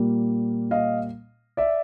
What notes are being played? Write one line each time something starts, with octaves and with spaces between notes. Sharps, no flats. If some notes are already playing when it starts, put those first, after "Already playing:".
Already playing: A#2 G3 A#3
D#5 F5
D5 E5